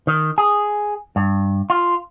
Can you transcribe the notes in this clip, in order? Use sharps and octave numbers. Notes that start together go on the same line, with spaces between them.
D#3
G#4
G2
F4